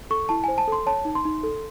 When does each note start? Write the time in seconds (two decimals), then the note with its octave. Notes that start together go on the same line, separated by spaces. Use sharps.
0.10 A4 C#6
0.29 E4 A5
0.44 C5 G#5
0.58 A5
0.68 A4 C6
0.86 C#5 A5
1.05 D#4
1.15 C6
1.25 D#4
1.43 A4